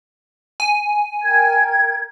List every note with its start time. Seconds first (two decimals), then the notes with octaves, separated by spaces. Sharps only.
0.60 G#5
1.23 A#4 G5 G#6